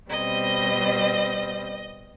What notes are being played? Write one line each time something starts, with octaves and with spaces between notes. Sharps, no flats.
B2 G3 C4 D#5